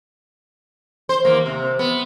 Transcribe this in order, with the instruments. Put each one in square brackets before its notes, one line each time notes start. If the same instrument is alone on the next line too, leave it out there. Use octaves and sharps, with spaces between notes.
[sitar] C5
D#2 A#3
C3
B3